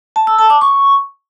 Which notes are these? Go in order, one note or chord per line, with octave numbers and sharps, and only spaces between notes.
A5
E6
A5
D6
C#6